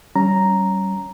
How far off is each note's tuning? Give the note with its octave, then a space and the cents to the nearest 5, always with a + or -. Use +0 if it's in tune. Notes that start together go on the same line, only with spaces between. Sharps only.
G3 -25 C#4 +0 A#5 +0